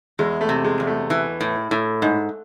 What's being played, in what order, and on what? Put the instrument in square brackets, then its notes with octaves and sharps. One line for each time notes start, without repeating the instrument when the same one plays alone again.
[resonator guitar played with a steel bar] E2 [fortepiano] G#3
[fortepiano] A3
[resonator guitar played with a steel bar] C3
[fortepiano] G#3
[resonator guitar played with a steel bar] E2
[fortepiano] A3
[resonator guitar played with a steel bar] E3
A2
A2
G#2